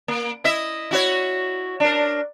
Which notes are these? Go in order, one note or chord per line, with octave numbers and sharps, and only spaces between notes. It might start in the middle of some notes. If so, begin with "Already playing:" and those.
A#3
E4 D#5 E5
E4 F#4 C#5
D4 A#4